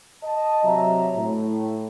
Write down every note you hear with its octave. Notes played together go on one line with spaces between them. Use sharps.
D#5 A5
C3 F#3 E5 A#5
A2